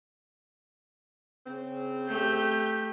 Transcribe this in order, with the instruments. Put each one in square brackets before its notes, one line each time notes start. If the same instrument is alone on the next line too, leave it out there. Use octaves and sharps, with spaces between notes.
[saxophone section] C#3 C4
[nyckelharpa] A3 G4 [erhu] G6